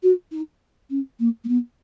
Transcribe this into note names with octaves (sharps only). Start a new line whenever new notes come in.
F#4
D#4
C#4
A#3
A#3
B3